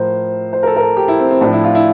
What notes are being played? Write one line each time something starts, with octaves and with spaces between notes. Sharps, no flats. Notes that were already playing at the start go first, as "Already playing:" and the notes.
Already playing: A2 F3 A#4 C5
C5
A#4
A4
A#4
A4
G4
E4
C4
C4
A2 F3 D4
E4
F4
E4